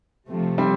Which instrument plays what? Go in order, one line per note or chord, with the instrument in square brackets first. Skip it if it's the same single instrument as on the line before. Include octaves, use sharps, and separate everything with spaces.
[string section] C3 F3 A3
[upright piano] G3 C4